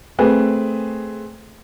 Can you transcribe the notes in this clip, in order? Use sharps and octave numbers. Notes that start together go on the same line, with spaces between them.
A3 C4 G#4 B4